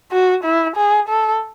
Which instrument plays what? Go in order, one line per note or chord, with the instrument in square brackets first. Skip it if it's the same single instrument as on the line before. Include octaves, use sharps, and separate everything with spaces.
[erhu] F#4
E4
G#4
A4